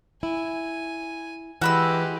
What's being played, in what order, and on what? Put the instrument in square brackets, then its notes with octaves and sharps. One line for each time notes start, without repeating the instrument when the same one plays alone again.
[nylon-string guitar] E4 [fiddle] G#5
[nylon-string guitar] E3 [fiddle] G#3 G4 [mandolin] F#4 B5 E6